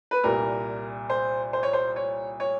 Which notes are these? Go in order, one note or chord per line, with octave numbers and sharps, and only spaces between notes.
B4
C2 A#2 G3 A#4
C5
C5
C#5
C5
C#5
C#5